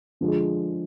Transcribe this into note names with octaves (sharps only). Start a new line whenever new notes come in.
D3 F3 G#3